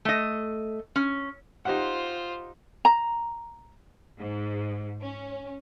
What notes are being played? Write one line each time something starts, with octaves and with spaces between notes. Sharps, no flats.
A3 D#5
C#4
D#4 F4 G4 C5 F#5
A#5
G#2
C#4